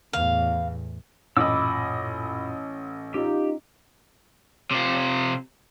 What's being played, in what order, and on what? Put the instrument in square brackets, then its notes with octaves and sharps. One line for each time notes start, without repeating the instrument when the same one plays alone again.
[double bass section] E2 A2 [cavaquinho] F5
[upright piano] A1 D#5 [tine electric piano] F#2 A#2 F4 [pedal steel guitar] B5 D6 E6
[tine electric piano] C#4 [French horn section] D#4 F4 [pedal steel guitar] G4
[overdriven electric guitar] C3 F4